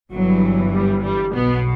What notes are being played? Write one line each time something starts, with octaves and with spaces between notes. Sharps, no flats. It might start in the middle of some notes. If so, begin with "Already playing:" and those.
G1 G2 E3 F#3
G3
G3
B1 B2 B3